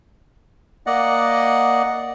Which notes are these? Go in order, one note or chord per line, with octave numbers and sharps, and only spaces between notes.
A#3 D5 D#5 F#5